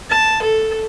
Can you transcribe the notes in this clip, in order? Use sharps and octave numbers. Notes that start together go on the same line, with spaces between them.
A5
A4